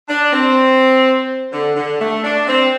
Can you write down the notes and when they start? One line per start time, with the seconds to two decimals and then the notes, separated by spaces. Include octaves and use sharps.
0.09 D4
0.33 C4
1.52 D3
1.76 D3
2.00 A3
2.24 D4
2.48 C4